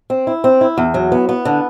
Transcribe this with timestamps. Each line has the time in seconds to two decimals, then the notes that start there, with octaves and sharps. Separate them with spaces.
0.10 C4
0.27 E4
0.44 C4
0.61 E4
0.78 E2
0.94 F#3
1.12 B3
1.29 B3
1.45 D3